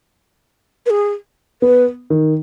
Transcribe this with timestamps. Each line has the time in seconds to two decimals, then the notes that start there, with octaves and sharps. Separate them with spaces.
0.86 B4
0.90 G#4
1.62 B3 B4
2.10 D#3